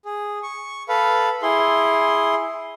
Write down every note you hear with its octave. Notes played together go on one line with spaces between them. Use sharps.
G#4
C#6
A4 B4 F5
E4 G#4 C6